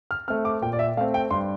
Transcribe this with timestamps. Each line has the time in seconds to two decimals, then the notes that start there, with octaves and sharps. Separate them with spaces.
0.11 F6
0.28 A3 C4 F6
0.45 D6
0.62 A#2 G5
0.73 D5
0.79 E5
0.97 A3 C4 F5
1.14 G5
1.31 G2 C6